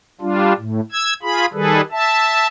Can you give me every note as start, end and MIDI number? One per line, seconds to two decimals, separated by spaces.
0.21 0.53 55
0.21 0.53 62
0.21 0.53 65
0.57 0.80 45
0.92 1.14 88
0.92 1.14 92
1.23 1.46 65
1.23 1.46 68
1.23 1.46 83
1.53 1.81 51
1.53 1.81 55
1.53 1.81 68
1.53 1.81 69
1.53 1.81 71
1.92 2.47 76
1.92 2.47 81